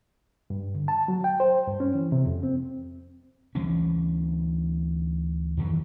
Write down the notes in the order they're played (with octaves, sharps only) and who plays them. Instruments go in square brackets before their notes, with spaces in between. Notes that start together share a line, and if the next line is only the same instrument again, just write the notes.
[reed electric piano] G2
D3
A5
F#3
G5
C5
G2
C#4
E3
C3
F2
C4
[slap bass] D2 E3 G3 C#4
F2 D#3 E3 F#3